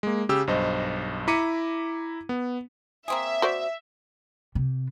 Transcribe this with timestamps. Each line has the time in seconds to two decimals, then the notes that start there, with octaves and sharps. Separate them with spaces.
0.03 G#3 A#3
0.29 C#3 G4 E6
0.47 B1 G2 C5 D#5
1.28 E4 A#5 D6 B6 C#7 D#7
2.29 B3
3.08 A#3 C4 G#4 E5
3.42 F#4 C5 D5
4.55 C3